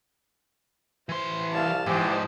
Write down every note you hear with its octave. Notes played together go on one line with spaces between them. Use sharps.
E3 C5 C6
C2 F5 A5
E2 G#2 F3 G#3 G4 C5